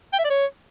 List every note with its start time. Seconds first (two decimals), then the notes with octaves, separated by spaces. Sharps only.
0.13 G5
0.19 E5
0.24 D5
0.30 C#5